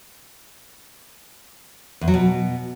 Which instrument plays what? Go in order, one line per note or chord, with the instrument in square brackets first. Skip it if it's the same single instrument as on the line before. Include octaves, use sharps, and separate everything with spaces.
[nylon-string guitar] E2
F#3
B2